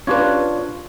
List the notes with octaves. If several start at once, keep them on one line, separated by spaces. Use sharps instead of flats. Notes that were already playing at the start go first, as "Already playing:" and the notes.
C#4 D4 F4 G4 B4 C#5